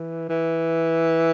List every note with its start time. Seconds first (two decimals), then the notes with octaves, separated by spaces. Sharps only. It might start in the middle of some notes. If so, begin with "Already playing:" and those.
Already playing: E3
0.29 E3